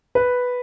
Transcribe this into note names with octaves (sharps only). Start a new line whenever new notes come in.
B4